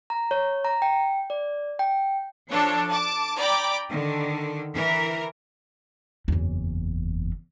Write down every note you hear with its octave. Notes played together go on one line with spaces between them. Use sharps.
A#5
C#5
A#5
G5
D5
G5
F3 D4 A4 C#5
A5 D6
D5 G5 A#5 B5 D6
D3 D#3
E3 A#4
F#1 E2